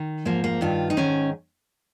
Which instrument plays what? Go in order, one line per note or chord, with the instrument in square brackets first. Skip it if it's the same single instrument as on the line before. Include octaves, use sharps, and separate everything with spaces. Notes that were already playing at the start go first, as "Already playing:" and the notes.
Already playing: [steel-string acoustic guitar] D#3
G#2 F3 A#3
A#3
G2 D#3 F4
D#4
G#2 D#3 C#4